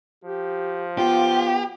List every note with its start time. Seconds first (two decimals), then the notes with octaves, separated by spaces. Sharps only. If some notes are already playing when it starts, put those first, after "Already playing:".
0.24 F3 G4
0.98 B3 F4 G4